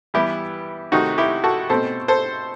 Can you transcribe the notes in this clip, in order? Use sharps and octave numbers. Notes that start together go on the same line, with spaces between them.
E3 G3 B3 E4 G4
C3 D#3 A3 C4 D#4 F#4
E4 G4
F#4 A4
B2 A3 C4 A4 C5
A4 C5